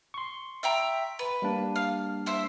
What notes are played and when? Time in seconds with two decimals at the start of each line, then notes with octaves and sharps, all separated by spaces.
0.14 C6 C#6
0.63 E5 G5 A#5
1.19 B4
1.42 G3 A#3 D4
1.76 F5
2.26 E4 C5 E5